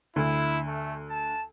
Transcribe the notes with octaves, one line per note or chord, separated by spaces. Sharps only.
D2 E4
A3
A5